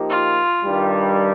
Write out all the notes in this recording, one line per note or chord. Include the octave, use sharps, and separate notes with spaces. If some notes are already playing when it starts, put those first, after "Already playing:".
Already playing: F3 A#3 D#4 G4
F4
G2 D#3 G3